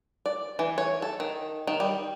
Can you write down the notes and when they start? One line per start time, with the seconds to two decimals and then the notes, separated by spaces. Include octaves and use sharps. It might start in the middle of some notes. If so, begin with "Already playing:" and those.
0.26 D5
0.59 E3
0.78 C#5
1.02 A4
1.20 D#3
1.67 D#3
1.80 G3